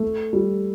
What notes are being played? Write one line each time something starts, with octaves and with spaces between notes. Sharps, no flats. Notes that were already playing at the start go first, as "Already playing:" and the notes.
Already playing: A3
G3